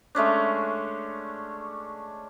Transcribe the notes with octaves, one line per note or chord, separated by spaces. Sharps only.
G#3 A3 C#4 D4